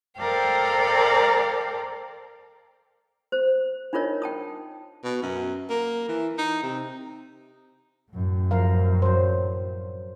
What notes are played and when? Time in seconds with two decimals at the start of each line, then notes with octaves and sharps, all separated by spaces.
0.18 A4 A#4 C5 D5 F5 G5
3.32 C5
3.93 D4 D#4 F4 A#4 C#5 D#5
4.22 G5 A5 D#6
5.04 B2
5.23 F#2
5.70 A#3
6.08 E3
6.38 D#4
6.63 C3
8.12 F#2 A2
8.51 F3 A#4 F5
9.02 F#3 C5